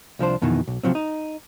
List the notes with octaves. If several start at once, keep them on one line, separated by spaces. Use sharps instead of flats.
C2 F3 D4 C5
F2 B2 D#3 E3
B1
C3 F3 F#3 C4
D#4